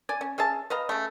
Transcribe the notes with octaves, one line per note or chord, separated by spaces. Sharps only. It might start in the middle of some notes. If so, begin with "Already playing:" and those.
D5 G#5
C#4
C#4 G#4 E5 A5
B4 D#5 F5 A#5
C#3 A3